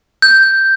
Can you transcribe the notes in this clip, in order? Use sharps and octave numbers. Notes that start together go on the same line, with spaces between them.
G6